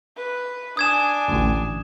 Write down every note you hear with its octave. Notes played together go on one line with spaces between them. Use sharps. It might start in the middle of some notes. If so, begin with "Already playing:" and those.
B4
D4 G#5 D#6 G#6 E7
A1 D2